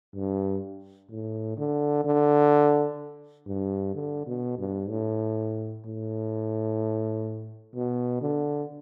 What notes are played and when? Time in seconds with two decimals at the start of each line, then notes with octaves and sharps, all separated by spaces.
0.14 G2
1.10 A2
1.57 D3
2.04 D3
3.47 G2
3.94 D3
4.26 B2
4.58 G2
4.89 A2
5.85 A2
7.75 B2
8.21 D3